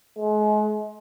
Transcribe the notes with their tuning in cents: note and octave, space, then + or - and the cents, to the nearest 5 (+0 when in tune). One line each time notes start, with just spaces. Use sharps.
G#3 +35